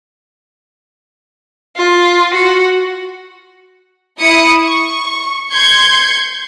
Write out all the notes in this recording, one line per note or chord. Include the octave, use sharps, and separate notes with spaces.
F4
F#4
E4 D#6 C#7
C#6
C6 G6 G#6 C#7